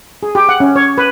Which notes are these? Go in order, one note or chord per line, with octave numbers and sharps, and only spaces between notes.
G#4
G4
F#5
C#4
C#5
B4